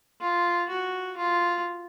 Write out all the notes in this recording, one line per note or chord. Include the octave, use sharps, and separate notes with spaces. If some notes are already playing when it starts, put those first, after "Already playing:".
F4
F#4
F4